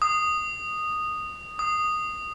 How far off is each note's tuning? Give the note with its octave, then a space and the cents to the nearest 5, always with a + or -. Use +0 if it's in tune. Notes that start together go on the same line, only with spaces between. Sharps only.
D#6 -10
D#6 -10